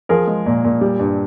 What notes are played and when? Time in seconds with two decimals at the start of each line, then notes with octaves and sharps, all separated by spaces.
0.09 F3 G#4 A#4
0.27 G#3
0.46 A#2
0.64 A#2
0.81 G3
0.99 G2